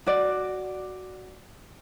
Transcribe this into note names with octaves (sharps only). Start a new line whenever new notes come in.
F#4 D5